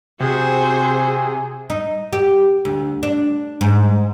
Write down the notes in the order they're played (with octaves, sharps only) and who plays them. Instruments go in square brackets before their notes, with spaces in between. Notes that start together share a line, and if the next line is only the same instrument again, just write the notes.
[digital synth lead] C3 [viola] F#4 C5 [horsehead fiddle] G#4
[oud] D#4
G4
D2
D4
G#2